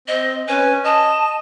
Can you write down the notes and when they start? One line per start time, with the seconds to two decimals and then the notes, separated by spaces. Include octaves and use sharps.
0.08 C4 D#5
0.48 C#4 B4 G#5
0.84 D#5 A5